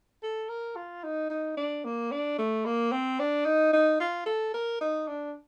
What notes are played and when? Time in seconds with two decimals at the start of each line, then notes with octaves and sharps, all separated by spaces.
0.23 A4
0.49 A#4
0.76 F4
1.04 D#4
1.30 D#4
1.57 D4
1.85 A#3
2.12 D4
2.38 A3
2.65 A#3
2.92 C4
3.19 D4
3.45 D#4
3.73 D#4
4.00 F4
4.26 A4
4.54 A#4
4.81 D#4
5.08 D4